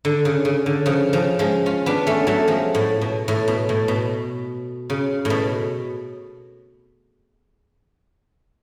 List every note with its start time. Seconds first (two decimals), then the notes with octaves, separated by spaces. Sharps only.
0.05 D3
0.25 C#3
0.45 C#3
0.66 D3
0.86 C#3 F3
1.13 C#3 F3
1.39 F3 G#3
1.66 C#4 F4
1.86 B3 D4
2.07 A3 C#4
2.27 F#3 A3
2.48 F3 G#3
2.75 A2
3.01 B2
3.28 A2
3.48 B2
3.69 A2
3.88 B2
4.90 C#3
5.25 A2
5.30 B2